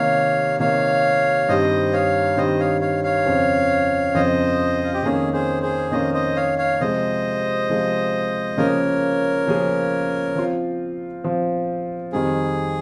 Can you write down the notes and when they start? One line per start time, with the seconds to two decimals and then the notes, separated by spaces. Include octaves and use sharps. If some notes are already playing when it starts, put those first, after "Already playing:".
Already playing: C3 D#3 A#3 C#5 F5
0.59 C3 D#3 A#3 C#5 F5
1.49 G2 D#3 G3 C4 G4 C5 D#5
1.93 C#5 F5
2.37 G2 D#3 G3 C4 G4 C5 D#5
2.60 C#5 F5
2.81 C#5 F5
3.04 C#5 F5
3.26 F2 C#3 F3 C4
4.14 F2 C#3 F3 C4 C5 D#5
4.83 F4
4.94 G4
5.03 F2 D#3 A#3 C#4 G#4
5.33 G#4 C5
5.62 G#4 C5
5.91 F2 D#3 A#3 C#4 C5 D#5
6.14 C5 D#5
6.36 C#5 F5
6.58 C#5 F5
6.80 C3 F3 G#3 C5 D#5
7.69 C3 F3 G#3
8.58 C#3 F3 A#3 C#4 G#4 A#4 C#5
9.46 C#3 F3 A#3 C#4 G#4
10.36 F3 C4 F4
11.24 F3 C4 F4
12.13 F2 D#3 G3 C4 G#4